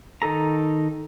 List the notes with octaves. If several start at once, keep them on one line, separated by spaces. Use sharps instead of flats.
D#3 D#4 A4 A#5